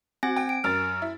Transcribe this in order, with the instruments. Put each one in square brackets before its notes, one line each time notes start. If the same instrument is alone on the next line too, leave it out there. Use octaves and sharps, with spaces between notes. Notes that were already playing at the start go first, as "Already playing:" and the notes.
[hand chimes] C4 G#5 A#6 [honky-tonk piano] F#4
[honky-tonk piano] G5
[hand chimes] D7
[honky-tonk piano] F#2 A#4 A6 [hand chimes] F6
[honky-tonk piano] E4